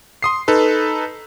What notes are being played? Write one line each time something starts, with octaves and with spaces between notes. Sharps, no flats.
C6 D#6 C7
D#4 A4 B4